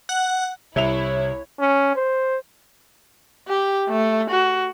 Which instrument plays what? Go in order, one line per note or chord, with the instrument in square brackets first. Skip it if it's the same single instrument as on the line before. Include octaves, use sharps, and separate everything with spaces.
[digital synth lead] F#5
[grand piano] C2 E5 F7 [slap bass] C3 [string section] E4 [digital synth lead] C#5
[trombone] C#4
C5
[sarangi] G4
A3
F#4